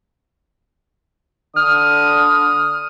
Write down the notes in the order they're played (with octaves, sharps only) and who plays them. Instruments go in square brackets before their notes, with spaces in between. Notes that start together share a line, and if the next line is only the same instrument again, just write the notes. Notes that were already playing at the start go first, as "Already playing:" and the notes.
[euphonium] D3 [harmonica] D#6 [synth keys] F6